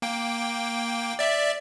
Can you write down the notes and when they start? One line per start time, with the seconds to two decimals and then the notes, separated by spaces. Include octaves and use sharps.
0.02 A#3 G5
1.19 D5 E5